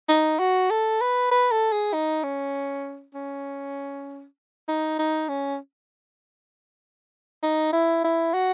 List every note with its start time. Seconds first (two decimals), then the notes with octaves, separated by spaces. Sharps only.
0.09 D#4
0.39 F#4
0.70 A4
1.01 B4
1.31 B4
1.51 A4
1.72 G#4
1.93 D#4
2.23 C#4
3.14 C#4
4.68 D#4
4.99 D#4
5.29 C#4
7.42 D#4
7.73 E4
8.04 E4
8.34 F#4